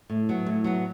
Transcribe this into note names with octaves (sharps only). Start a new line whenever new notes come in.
A2
F#3 B3
A2
F#3 B3